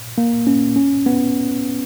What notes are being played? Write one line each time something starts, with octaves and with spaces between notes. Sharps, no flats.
A#3
C#4
C#4
B3